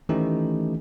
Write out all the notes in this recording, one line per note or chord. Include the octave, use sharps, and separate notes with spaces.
D#3 E3 A3 C#4 D#4 G4